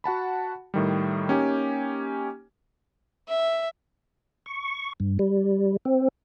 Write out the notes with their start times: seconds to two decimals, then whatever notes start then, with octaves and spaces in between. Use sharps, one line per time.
0.04 F#4 F#5 A5 B5
0.74 A2 D#3 G3
1.28 A#3 C#4 D#4 G4 G#5
3.28 E5
4.46 C#6
5.00 G2
5.19 G3
5.85 C4